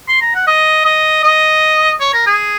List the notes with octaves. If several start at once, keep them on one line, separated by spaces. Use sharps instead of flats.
C6
A#5
F#5
D#5
D#5
D#5
C#5
A#4
G#4